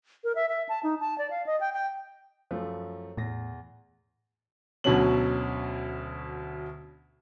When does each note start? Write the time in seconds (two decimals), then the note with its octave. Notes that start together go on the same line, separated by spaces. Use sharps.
0.24 A#4
0.35 E5
0.49 E5
0.69 A5
0.83 D#4
1.00 A5
1.18 D5
1.30 F5
1.46 D#5
1.61 G5
1.73 G5
2.51 F#2 F3 A3
3.17 E2 A2 A#6
4.84 D2 B2 D3 F#3 C#4 F#7